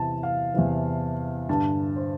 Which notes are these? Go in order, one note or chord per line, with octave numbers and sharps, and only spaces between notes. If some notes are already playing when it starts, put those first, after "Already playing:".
Already playing: E2 C3 E3 A5
F5
E2 C3 E3
G2 D3 A5
C5